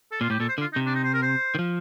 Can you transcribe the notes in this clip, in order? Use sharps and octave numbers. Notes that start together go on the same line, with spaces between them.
A4
A#2 F4
A2 G4
A#2 A4
C5
D3
F4
D#4
C3
D4
D#4
C5
A#4
C5
D#3
F3